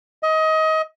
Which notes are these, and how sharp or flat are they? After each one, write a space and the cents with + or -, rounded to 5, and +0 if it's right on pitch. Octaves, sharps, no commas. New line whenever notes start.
D#5 +25